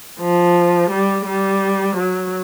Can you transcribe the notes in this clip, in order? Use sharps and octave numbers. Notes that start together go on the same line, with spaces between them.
F3
G3
G3
F#3